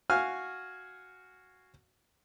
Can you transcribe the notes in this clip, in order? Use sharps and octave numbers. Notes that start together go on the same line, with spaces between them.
F#4 F5 G#5 F6